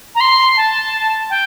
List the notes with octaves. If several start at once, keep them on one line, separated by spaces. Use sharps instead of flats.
A#5
C6
A5
G5